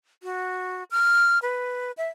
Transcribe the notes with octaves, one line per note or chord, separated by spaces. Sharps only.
F#4
F6
B4
E5